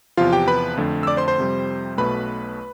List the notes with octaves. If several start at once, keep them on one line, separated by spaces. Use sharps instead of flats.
E2 C3 F3 F4 F5
G4 G5
B4 B5
F2 D3 A3
E6
D5 D6
C5 C6
C5 C6
F2 C3 G3
B1 B2 A3 B4 B5